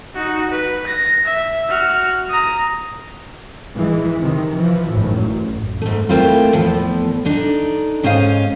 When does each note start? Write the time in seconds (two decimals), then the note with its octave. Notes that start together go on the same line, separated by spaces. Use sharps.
0.15 D#4 F#4
0.51 B4
0.87 A#6
1.25 E5
1.69 F#4 F6
2.29 A#5 D#6
3.75 E3 G#3
4.19 C3 D#3
4.53 E3 F3
4.92 G#1 F#2 A2
5.21 A1
5.81 G#2 A3
6.09 A3 A#3 C4 E4 F4
6.53 E2 A2 F3
7.25 D4 D#4 A4
8.03 G#2 C#4 C5 D#5 F5